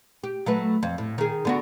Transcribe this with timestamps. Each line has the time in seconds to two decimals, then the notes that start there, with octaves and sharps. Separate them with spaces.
0.24 G4
0.46 F#3 A3 B4
0.83 F2
0.98 A2
1.18 D#3 G#4
1.45 D3 B3 F#4